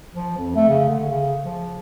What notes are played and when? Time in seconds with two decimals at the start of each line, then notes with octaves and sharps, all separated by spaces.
0.14 F3
0.38 F2
0.55 A3
0.68 C#3
0.88 D3
1.11 C#3
1.45 F3